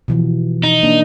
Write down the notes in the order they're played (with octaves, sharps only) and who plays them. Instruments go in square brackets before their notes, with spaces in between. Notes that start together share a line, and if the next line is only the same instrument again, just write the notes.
[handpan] B2 E3 F3
[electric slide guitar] D#4
[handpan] A#3 D4